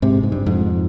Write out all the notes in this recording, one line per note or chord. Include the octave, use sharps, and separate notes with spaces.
G#2 C3
G#2
G2
F2 G#2